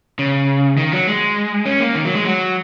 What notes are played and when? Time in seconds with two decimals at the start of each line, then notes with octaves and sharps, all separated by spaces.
0.19 C#3
0.77 D#3
0.92 F#3
1.07 G#3
1.66 C#4
1.80 A#3
1.95 D#3
2.05 F#3
2.15 G#3
2.25 F#3